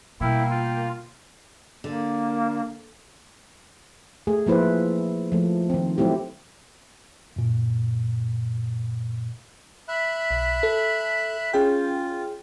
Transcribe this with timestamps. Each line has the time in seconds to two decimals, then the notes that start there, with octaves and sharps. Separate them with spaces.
0.21 B2 G3 A#3 E4 G5
0.50 F4
1.84 D3 A#3
4.27 A3 G#4
4.46 F3 A#3 E4 B4 C5
5.32 F3 A3
5.70 D#3 C4
5.98 F#3 A3 C4 E4 G4
7.36 F#2 A#2
9.88 E5 B5 F#6
10.31 B1
10.63 A4
11.53 C#4 F4 G#4 G5